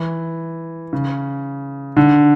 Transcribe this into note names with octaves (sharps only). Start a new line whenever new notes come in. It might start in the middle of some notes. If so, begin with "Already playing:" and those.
Already playing: E3
C#3
D3